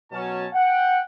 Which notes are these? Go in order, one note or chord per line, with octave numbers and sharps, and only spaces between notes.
B2 F#3 C#4 A5
F#5 G5